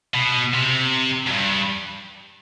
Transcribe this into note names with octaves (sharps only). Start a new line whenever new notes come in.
B2
C3
F#2
G2